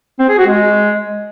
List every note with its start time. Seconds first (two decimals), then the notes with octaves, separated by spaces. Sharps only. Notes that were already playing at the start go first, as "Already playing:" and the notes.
0.19 C4
0.29 G#4
0.38 F#4
0.47 G#3